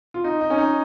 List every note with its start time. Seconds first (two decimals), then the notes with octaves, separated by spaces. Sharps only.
0.14 F4
0.24 D#4
0.41 D#4
0.50 C#4
0.58 D#4